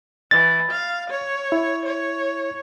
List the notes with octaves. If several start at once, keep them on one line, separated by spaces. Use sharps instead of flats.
E3 A6
F5
C#5
E4
C#5